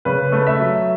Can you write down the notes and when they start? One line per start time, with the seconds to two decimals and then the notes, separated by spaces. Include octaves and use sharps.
0.05 C#3 B4
0.32 A3
0.47 E5
0.59 F#3